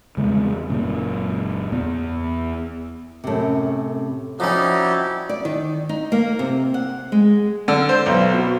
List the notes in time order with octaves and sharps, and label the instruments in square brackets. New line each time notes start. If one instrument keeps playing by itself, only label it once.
[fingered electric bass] E2 C#3 G3 G#3
F#1 A#2 A#3
E2 B3
[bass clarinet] F#2 [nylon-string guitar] A2 C3
[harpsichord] F3 C#4 [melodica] G3 E4 G4 [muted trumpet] D#4 [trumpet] F#4
[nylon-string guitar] D5
D#3
D#4
A#3
C3
F#5
G#3
[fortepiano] D3
C5
B1
B2